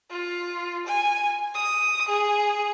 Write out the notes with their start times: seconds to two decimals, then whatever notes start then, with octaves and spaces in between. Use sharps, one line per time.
0.10 F4
0.86 G#5
1.55 D#6
2.08 G#4